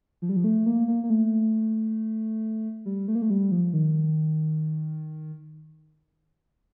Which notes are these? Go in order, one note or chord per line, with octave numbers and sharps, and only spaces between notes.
F3
G3
F3
A3
A#3
A#3
A#3
A3
G3
A3
A#3
A3
G3
F3
D#3